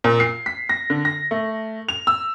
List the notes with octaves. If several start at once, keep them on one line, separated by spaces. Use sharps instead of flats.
A#2
C7
B6
A#6
D3
A#6
A3
F7
E6